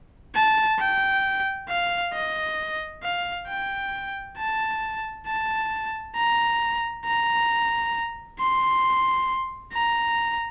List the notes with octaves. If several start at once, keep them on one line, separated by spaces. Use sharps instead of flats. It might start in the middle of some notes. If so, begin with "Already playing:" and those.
A5
G5
F5
D#5
F5
G5
A5
A5
A#5
A#5
C6
A#5